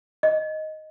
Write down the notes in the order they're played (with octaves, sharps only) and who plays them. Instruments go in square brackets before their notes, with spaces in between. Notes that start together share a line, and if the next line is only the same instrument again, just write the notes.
[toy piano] D#5